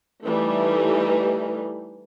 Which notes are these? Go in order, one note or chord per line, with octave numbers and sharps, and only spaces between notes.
E3 G3 A3 D#4